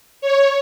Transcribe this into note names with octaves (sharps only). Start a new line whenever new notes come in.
C#5